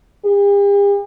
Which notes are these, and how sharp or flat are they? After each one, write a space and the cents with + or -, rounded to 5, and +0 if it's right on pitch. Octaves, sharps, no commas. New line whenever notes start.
G4 +45